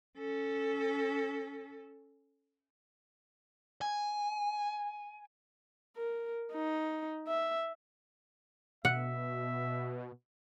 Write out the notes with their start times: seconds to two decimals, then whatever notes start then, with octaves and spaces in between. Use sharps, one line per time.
0.17 C#4 A4
3.81 G#5
5.96 A#4
6.53 D#4
7.28 E5
8.85 B2 E5 F#5